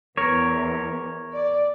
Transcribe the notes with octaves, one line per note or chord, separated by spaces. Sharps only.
E2 A#4 C#5
D5